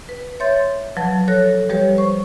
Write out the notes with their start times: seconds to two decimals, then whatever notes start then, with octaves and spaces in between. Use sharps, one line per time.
0.09 B4
0.40 C#5 E5 C6 G6 A6
0.97 F3 F#3 B4 A5
1.28 A4 C#5 F#6 A#6
1.69 F3 G3 G4 B4 C#5
1.98 C5 C#6